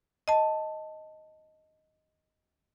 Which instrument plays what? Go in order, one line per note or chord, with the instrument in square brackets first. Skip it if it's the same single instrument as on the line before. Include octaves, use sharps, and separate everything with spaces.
[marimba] D#5 A5